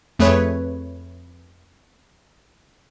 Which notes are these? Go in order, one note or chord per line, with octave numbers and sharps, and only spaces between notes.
F2 A3 G#4 B4 C#5